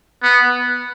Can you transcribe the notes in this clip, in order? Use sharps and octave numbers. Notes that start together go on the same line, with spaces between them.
B3